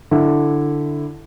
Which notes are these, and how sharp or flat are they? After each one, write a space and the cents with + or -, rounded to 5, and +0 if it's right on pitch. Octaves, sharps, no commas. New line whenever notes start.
D3 +0 E4 +0